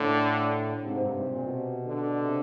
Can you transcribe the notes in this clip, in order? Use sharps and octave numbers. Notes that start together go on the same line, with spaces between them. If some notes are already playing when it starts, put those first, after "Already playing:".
Already playing: A2 D3
A2
G#2 C3
G2
B2
A#2
B2
D3
C3